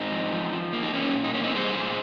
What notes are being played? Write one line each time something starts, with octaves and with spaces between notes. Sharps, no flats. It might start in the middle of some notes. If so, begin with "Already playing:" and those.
Already playing: G#2 C4 D#4
F3
F3
F3
A#3
D#4
A#3 C#4
A#2
D#4
A#3 C#4
C4 D#4
G3 G#4 C5
A#2